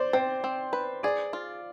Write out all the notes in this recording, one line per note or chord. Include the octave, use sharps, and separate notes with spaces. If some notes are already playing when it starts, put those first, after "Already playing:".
Already playing: C5 D5
C4 C5
C4
B4
G#4 D5
F4